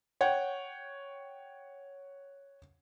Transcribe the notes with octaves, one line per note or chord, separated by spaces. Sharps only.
C#5 F#5 G5